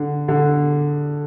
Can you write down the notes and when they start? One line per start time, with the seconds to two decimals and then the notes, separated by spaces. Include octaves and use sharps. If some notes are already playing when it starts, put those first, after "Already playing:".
Already playing: D3
0.28 D3